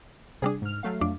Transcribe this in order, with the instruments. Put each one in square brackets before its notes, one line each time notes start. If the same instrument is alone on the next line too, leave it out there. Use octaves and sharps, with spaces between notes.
[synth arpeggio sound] C3 G3 D4 [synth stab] G#4
[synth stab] G#2 F6
F#3 A3 F5
[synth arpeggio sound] F2 D4 D6